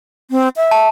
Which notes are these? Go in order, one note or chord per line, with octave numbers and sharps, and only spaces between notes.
C4
E5
A5